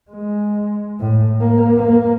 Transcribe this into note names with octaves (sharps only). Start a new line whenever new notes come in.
G#3
A2
A#3
A#3